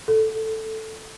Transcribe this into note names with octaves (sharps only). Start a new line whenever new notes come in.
A4